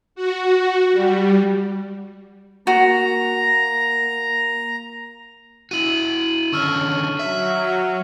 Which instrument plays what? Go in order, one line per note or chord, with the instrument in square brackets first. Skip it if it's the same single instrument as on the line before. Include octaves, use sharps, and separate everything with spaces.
[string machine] F#4
G3
[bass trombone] A#3 [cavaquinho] F#4 [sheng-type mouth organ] A#5
[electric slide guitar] E4 F#4 [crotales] D#7 F#7
[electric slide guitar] D3 D#3 C#4 [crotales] C#6 E6 F6
[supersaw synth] F#3 [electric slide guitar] E5